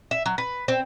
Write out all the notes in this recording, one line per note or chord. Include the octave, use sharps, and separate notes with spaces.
E5
F#3
B4
C4